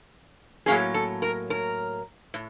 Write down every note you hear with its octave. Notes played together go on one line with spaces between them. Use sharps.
A2 F#3 A#3 C#4 G#4
A4
A#4
A#4
A2